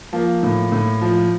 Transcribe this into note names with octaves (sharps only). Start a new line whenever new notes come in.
F3 A#3
A2
A2
F3